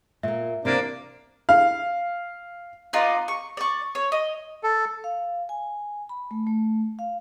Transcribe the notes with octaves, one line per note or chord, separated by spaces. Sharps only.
A#2 A#3 E5
C3 E3 A#3 D4
F5
B3 D#4 F4 D5
C#6
D5 C#6
C#5
D#5
A4
F5
G#5
B5
A3
A3
F5